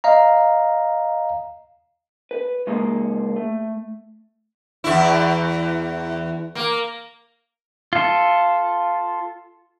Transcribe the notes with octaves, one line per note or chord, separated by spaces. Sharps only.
D#5 F5 A#5
B4
C#3 G#3 A#3 G#4 A4
A3
E2 E4
A#3
F4 A4